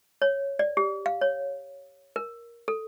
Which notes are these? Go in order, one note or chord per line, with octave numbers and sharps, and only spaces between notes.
C#5
D5
G4
F5
C#5
A#4
A4